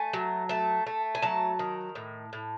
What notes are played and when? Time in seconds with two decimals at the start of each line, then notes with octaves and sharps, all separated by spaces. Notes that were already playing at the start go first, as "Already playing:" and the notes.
Already playing: A3 G#5
0.13 F#3
0.49 A3 A5
0.87 A3
1.15 G#5
1.22 F#3 A5
1.59 D#3
1.95 A2
2.33 A2